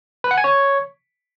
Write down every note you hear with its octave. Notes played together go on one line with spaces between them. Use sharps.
B4
F#5
G#5
C#5